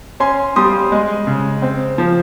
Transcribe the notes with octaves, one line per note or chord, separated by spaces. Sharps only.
C#4 G#5 C6
G3 C6 D#6
G#3
C#3
C4
F3